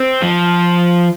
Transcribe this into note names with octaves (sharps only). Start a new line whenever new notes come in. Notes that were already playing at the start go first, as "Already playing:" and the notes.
Already playing: C4
F3